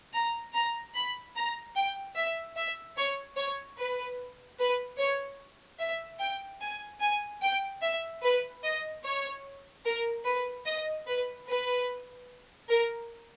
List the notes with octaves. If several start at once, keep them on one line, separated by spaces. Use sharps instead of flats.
A#5
A#5
B5
A#5
G5
E5
E5
C#5
C#5
B4
B4
C#5
E5
G5
G#5
G#5
G5
E5
B4
D#5
C#5
A#4
B4
D#5
B4
B4
A#4